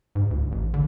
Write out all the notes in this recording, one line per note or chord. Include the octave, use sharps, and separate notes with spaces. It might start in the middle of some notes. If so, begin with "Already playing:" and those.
G#2
D2
A1
D3